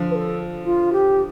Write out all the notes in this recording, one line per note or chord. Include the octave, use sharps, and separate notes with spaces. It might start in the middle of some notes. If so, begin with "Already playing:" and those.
Already playing: D3 F3
B4
A4
F4
G4